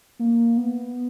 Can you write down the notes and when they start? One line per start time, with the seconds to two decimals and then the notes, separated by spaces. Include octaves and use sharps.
0.19 A#3
0.57 B3